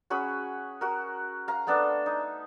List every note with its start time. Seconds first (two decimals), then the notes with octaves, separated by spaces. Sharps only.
0.10 C#4 F#4 G#4 B5
0.81 F#4 A#4
1.48 F5 A#5
1.67 A3 B3 D4 A4
2.06 D#4